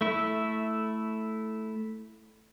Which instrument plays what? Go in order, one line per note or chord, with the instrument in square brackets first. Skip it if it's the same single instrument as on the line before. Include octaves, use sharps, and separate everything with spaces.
[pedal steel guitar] A3 E4